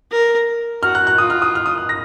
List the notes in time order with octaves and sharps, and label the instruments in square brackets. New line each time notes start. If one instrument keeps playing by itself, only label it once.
[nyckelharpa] A#4
[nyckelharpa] F#4 [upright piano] F6
[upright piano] F#6
F#6
[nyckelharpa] F4 [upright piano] D#6
[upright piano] F6
D#6
F6
D#6
F#6
A#6